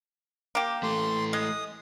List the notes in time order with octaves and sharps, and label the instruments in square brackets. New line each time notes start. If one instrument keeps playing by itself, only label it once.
[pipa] A#3 G4
[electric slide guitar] E3 A3 [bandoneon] C6
[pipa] G#3 [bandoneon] D#6